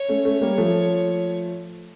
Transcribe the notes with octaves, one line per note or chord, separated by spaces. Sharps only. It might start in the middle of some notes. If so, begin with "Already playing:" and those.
Already playing: C#5
A3 C#4
A3 C#4
G3 A#3
F3 A3